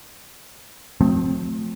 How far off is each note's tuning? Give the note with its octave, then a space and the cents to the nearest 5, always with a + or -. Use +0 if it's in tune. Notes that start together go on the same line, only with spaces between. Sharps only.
F3 +45 A3 +0 C4 +0